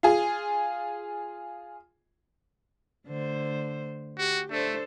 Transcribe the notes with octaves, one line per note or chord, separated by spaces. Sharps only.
F4 G#4
D3 A3 C5
F#4 G4
A3 D4 A4 C5